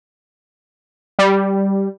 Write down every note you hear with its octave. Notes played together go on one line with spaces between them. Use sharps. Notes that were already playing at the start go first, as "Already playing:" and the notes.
G3